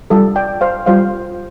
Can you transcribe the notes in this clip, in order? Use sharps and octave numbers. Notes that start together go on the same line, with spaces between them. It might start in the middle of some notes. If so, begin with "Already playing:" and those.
G3 F4 A4
D5 G5
C5 F5
G3 F4 C5 F5